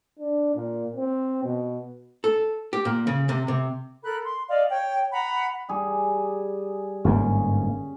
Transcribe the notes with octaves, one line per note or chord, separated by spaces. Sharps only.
D4
A#2
C4
B2
A4
G4
A#2
C#3
C3
C3
A4 A#4 B5 F#6
C6
D5 D#5 F5
C#5 G5
F#5 A#5 B5
G3 G#4
G1 G#2 A#3 C#4